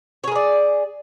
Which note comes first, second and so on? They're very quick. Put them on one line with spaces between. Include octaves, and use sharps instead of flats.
C#5 G#4 A#4 D5